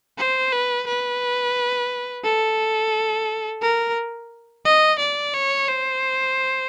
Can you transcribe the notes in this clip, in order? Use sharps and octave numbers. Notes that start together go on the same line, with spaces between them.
C5
B4
B4
A4
A#4
D#5
D5
C#5
C5